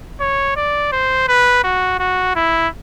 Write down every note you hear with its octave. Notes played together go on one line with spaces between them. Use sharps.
C#5
D5
C5
B4
F#4
F#4
E4